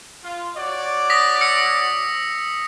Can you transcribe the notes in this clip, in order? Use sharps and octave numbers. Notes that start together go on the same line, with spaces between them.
F4
F#4 C#5 D5
D#6 A#6 B6
E6 C#7